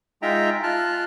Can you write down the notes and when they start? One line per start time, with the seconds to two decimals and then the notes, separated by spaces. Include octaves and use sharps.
0.22 G#3 D#4 F4 E5 G5 A#5
0.63 F4 A5 F6 F#6